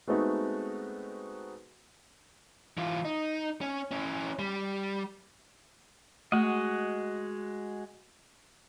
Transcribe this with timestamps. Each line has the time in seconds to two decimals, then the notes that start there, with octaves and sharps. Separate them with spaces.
0.07 G#3 A3 B3 C4 D#4 F#4
2.77 E3 F4
3.05 D#4
3.61 C#4
3.91 C#4 E4
4.39 G3
6.32 G#3 A3 F#4 D#5